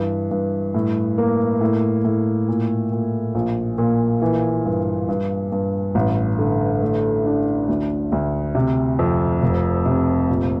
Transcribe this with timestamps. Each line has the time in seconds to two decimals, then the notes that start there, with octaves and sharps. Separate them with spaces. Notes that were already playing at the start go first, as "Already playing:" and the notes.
Already playing: G2 E3
0.31 G2
0.74 A2
1.18 A#3
1.61 A2
2.05 A2
2.48 A#2
2.92 A#2
3.35 A#1
3.78 A#2
4.22 E3
4.65 G2
5.08 G2
5.52 G2
5.95 A1
6.39 D3
6.82 A3
7.26 D4
7.69 D2
8.12 D2
8.55 C3
8.99 F2
9.43 F1
9.86 C3
10.29 A#1